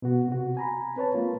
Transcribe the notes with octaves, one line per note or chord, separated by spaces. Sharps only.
B2 B3 F#4
C3 F#4
G#5 A#5 B5
C4 B4 C#5 A5
G#3 A#3 F4